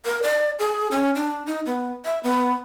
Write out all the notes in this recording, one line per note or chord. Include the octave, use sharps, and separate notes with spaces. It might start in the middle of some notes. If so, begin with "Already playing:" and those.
A#4
D5
G#4
C#4
D4
D#4
B3
E5
B3